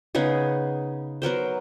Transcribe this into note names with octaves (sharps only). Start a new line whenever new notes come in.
C#3 B3 D#4 G#4
F#3 B3 A#4 C5